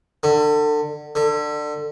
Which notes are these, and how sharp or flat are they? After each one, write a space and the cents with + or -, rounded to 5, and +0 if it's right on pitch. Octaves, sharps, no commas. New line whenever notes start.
D3 +30
D3 +25